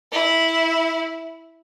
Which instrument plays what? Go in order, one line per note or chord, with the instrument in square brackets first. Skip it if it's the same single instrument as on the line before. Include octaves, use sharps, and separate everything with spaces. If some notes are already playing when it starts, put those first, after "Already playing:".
[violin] E4